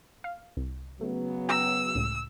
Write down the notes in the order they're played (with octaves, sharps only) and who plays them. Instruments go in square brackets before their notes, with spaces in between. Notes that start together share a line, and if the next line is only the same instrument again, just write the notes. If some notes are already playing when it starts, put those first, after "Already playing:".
[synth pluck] F5
C2
[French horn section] C#3 F#3 B3 [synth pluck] A3
[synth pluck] G5 A#5 [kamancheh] E6
[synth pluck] C#2 A2